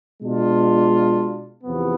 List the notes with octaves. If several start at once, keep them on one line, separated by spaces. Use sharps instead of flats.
B2 G#3 D4 F4
E2 C3 F3 B3